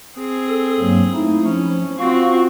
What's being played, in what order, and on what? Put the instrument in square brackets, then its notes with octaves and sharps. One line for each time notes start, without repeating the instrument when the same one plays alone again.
[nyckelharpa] C4 G#4
[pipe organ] A4
G2 F#3 A#3
A3 D#4 E4
[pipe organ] F3 [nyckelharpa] C#4
[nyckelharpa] C4 F#4 [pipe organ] F4 F5 C#6